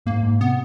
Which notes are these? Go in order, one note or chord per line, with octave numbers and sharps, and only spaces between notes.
G#2 A#3
G#2
C3 B3